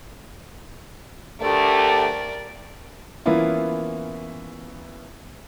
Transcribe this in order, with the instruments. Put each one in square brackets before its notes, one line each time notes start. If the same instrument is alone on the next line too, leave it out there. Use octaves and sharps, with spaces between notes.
[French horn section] D2 A3 G4 [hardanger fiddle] A#4 D5
[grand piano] E3 A#3 B3 C#4 E4 F4